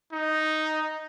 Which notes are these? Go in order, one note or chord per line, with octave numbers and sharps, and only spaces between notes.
D#4